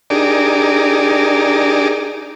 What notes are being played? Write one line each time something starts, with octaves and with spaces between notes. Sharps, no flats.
D4 D#4 G4 G#4 A#4 D5